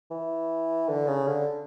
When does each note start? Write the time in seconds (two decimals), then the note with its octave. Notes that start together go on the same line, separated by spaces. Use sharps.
0.11 E3
0.89 D3
1.08 C#3
1.27 D3